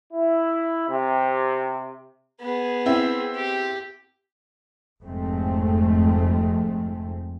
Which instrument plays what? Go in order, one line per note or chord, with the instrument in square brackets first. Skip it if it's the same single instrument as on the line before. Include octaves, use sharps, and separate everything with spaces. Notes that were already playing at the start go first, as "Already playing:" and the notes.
[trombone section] E4
C3
[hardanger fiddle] B3 G#4
[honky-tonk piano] C4 E4
[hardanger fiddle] G4
[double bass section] F1 F2 G#2 G#3 A3 C4